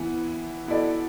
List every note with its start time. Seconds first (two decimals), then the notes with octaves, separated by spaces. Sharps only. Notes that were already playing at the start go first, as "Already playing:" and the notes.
Already playing: E3 B3 E4
0.67 B2 B3 E4 A4 D5